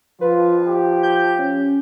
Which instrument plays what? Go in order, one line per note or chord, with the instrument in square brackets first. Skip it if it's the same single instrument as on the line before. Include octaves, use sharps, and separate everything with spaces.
[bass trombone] F3 [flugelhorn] F4 [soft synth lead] B4
[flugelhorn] G4
[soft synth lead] G6
C#4